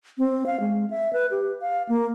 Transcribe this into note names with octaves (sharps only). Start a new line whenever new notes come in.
C4
F5
G#3
E5
B4
G4
F5
A#3